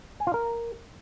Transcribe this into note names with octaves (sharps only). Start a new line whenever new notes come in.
G#5
F4
A#4